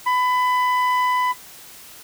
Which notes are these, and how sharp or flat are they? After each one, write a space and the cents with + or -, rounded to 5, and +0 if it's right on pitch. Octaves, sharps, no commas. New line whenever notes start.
B5 +20